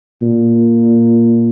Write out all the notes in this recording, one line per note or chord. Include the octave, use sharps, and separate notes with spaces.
A#2